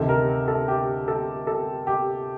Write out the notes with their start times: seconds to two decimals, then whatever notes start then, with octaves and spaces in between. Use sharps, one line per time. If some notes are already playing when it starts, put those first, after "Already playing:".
Already playing: D2 C3 D#3 A4
0.09 A#4
0.48 A4
0.68 G4
1.08 A4
1.47 A4
1.87 G4